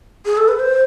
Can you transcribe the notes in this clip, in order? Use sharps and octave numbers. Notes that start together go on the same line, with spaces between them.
G#4
A4
B4
C5